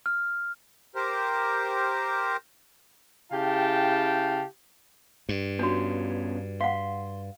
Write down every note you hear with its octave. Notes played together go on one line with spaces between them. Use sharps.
F6
G4 A#4 C5
C#3 E4 G4 F5 G5 A5
G2
B3 C#4 D4 F4 F#4
F5 F#5 C6